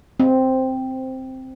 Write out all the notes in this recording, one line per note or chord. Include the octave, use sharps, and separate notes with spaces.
C4